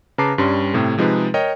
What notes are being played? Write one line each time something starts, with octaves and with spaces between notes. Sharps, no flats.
C#3 B4 A5 A#5 D6 C7
G2 G3 C#4 C6
A2 C3 A3
C3 F3 G#3 D#4 G#4 B4
A#4 C#5 D#5 G5